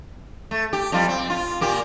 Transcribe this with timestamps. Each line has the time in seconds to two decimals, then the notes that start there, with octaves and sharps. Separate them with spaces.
0.51 A3
0.73 G4
0.92 F2 G3 F4
1.09 C4
1.30 F4
1.61 A#2 A#3 G4